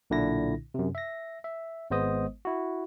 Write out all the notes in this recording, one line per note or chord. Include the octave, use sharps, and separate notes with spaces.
B1 A#2 D3 D4 E4 A#6
F#2 C3
E5 A#6
E5
G#1 G#3 B3 C5 D#5 D#6
E4 F#4